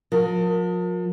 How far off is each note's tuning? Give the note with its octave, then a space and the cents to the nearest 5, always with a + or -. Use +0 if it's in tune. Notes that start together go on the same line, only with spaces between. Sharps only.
F3 +45 A#4 +5